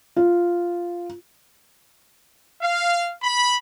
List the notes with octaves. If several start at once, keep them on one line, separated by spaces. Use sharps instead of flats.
F4
F5
B5